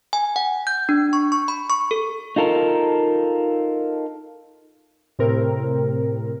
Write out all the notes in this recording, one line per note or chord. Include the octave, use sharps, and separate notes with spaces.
G#5
F#5
G6
D4
C#6
C#6
B5
C#6
A4
D#4 F4 A4 A#4
A2 C3 C4 A#4